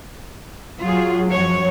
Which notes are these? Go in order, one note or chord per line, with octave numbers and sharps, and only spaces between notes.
F#3 F4 G#4
F#2 F3 C#5